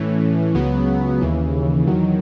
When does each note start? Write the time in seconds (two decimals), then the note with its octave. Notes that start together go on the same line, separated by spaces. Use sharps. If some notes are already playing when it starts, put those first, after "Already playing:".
Already playing: A2 E3 A3 C#4
0.55 C#2 C#3 F#3 B3
1.21 D#2 C#3 E3
1.87 E2 D#3 F#3